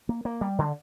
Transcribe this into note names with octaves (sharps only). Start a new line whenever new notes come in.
A#3
A#3
G3
D3